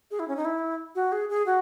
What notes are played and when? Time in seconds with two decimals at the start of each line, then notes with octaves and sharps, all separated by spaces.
0.11 G#4
0.19 E4
0.28 C#4
0.36 D#4
0.45 E4
0.95 F#4
1.12 G#4
1.29 G#4
1.46 F#4